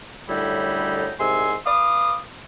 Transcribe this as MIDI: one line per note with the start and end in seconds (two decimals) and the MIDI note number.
0.29 1.12 42
0.29 1.12 45
0.29 1.12 50
0.29 1.12 55
0.29 1.12 63
0.29 1.12 64
1.19 1.55 36
1.19 1.55 44
1.19 1.55 48
1.19 1.55 80
1.19 1.55 84
1.19 1.55 88
1.66 2.17 71
1.66 2.17 77
1.66 2.17 86
1.66 2.17 87